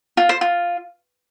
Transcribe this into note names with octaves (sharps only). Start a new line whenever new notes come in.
F4
C5
F4